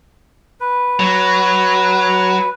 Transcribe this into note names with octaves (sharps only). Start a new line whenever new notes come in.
B4
F#3